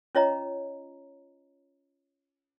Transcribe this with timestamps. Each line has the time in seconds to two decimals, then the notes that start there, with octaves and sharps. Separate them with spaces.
0.15 C#4 F4 C#5 D#5 A#5